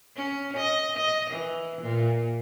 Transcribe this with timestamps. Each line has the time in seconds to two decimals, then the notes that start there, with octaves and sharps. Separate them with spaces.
0.16 C#4
0.56 D#5
0.97 D#5
1.30 E3
1.81 A#2